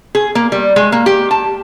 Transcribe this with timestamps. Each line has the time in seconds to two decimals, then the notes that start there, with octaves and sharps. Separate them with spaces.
0.15 G#4
0.35 A#3
0.52 G3
0.76 G#3
0.92 A#3
1.06 G4
1.31 A5